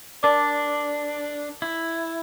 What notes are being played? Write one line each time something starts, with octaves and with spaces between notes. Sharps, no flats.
D4 A#4 D5 A5 D6
E4